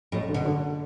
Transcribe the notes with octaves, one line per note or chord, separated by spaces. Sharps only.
F#1 A2
D3
B2
D3